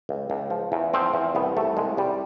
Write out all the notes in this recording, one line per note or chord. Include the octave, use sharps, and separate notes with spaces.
C#2
C#2
F3
E2
F3 C4
E2
C2 B3
C2 A3
C2 G#3
C2 G3